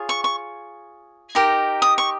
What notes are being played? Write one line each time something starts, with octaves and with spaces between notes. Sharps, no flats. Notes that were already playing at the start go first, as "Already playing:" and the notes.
Already playing: F4 G#4 C#5
C#6
C#6
D#4 G4 A#4
D#6
C#6